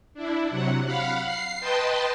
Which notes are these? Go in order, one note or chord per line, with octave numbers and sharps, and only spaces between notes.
D4 E4
C3 F#3 F#5
F5 F#5 B5
C7
B4 D#5 G5 A5 C6